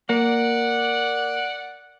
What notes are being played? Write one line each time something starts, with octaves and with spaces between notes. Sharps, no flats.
A#3 D5 F#5